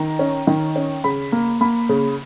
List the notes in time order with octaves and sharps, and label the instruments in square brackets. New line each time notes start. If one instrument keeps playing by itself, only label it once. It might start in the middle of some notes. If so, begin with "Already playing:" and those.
Already playing: [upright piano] D#3 A#5
C#4
D#3
C#4
C#3 B5
A#3
A#3 B5
C#3